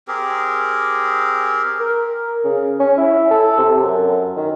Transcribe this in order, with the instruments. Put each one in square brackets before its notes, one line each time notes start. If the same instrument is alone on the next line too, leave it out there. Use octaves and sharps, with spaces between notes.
[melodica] C4 G4 G#4 A#4
[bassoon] A#4
C#3
C#4
E4
A4
C3
F#2
D#3